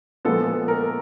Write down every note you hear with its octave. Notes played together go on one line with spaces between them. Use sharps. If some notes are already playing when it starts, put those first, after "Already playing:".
A#2 F3 G#3 B3 A4
A4
A#4